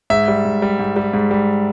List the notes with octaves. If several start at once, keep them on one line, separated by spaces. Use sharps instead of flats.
G#2 E5
G3
G#2
G3
G#2
G3
G#2
G3